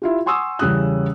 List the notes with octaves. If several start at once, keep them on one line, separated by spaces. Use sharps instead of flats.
E4 F4 G4
F#5 G#5 C6 C#6 D#6 E6
E2 C#3 G3 C#4 D#6 F#6